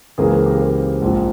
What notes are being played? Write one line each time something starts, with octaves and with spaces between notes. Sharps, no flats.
C#2 C#3 E3 A#3 G#4 C5
G#4 C5
G4 A#4
G#4 C5
A#1 G#2 F3 C4